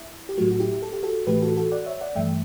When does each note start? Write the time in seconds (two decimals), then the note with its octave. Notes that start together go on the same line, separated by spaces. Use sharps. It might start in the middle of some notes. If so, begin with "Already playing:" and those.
Already playing: E4
0.29 G4
0.38 A2 F#3 A3 F#4
0.51 F#4
0.60 E4 G4
0.82 A4
0.93 G4
1.03 F#4 A4
1.27 A2 E3 A3 G4 B4
1.42 F#4 A4
1.57 F#4 A4
1.72 D5 F#5
1.86 C#5 E5
2.01 D5 F#5
2.15 G2 E3 A3 E5 G5